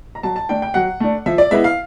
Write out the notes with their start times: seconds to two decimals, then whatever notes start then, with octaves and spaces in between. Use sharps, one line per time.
0.15 A#5
0.23 F#3 A5
0.36 A5
0.49 A3 D4 G5
0.62 G5
0.74 F#3 F#5
1.00 A3 D4
1.26 F3 E5
1.38 D5
1.51 G#3 B3 E4 E5
1.64 F5